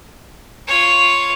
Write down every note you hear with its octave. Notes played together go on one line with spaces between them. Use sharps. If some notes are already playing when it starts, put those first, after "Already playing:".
F4 C#5